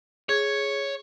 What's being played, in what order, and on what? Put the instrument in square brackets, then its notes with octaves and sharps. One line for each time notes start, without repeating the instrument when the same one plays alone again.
[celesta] G#4 G#6 [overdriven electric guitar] C#5